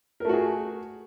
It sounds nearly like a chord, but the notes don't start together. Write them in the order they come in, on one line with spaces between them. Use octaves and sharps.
A#4 A3 F#4 G#4